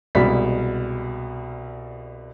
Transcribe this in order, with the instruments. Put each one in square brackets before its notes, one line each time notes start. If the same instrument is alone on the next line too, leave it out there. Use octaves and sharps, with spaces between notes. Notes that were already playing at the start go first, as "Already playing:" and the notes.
[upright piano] C2 B2 G#3 D5 B5 B6